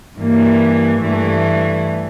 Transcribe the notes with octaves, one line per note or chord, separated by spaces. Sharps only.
G2 E3 A#3
G2 E3 A3